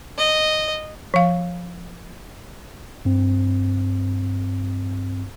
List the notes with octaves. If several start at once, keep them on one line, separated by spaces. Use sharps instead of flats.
D#5
F3 F5
G2 C4